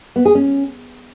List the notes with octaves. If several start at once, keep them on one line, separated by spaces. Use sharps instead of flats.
B3
G#4
C#4